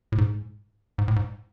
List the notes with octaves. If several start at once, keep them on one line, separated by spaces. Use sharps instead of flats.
A2
G#2
G#2
A2
G#2